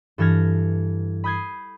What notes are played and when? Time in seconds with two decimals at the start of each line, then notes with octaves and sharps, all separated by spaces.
0.18 G2 E3 A4 F6 G#6 A#6
1.24 B5 D#6 G6 G#6 C7